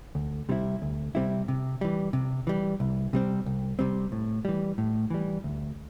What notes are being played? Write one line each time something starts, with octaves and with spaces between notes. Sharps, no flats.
D2
C3 G3 C4 E4
D2
C3 G3 C4 E4
C3
E3 G3
C3
E3 G3
C2
C3 G3 C4
C2
C3 G3 C4
A2
E3 G3
A2
E3 G3
D2